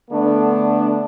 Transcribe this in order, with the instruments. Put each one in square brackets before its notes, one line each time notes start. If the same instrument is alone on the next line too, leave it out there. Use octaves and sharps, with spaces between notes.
[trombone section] D3 A3 B3 D4